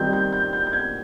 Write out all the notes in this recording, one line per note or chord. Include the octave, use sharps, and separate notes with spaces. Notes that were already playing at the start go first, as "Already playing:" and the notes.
Already playing: D#3 G3 C4 D#4 G6
G6
G6
G6
G6
G#6